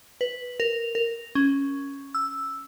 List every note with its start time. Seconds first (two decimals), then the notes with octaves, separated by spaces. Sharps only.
0.21 B4
0.60 A#4
0.95 A#4
1.35 C#4
2.15 E6